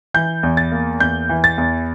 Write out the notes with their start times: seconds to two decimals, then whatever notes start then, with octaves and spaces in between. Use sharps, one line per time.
0.14 E3 G6
0.43 E2
0.57 A6
0.72 A#3
1.00 E2 G6
1.29 E3
1.44 A6
1.58 E2